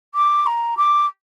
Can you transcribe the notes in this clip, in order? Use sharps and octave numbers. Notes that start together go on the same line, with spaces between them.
D6
A#5
D6